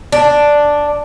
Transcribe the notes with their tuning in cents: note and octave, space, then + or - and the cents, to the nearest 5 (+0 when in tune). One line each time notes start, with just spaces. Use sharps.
D4 +0 D5 +0